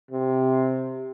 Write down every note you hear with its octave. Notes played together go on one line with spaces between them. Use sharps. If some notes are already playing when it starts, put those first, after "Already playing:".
C3